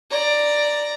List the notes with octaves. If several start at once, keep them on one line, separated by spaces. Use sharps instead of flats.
D5 A#5